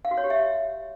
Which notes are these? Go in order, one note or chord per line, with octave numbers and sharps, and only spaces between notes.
F5
F#4
C#5
G4
E5